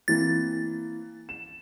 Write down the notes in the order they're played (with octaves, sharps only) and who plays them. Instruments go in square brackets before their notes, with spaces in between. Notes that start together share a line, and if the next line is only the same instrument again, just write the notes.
[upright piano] E3 A#3 C4 [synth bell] A6
[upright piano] E7